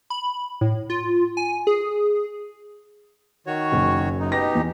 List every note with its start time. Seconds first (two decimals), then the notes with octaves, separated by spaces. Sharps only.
0.10 B5
0.61 A2
0.90 F4
1.37 G#5
1.67 G#4
3.47 D#3 F#4 C#5
3.72 F#1
4.20 F#2 D#4
4.32 B2 D#4 G4 B4 A#6
4.55 E2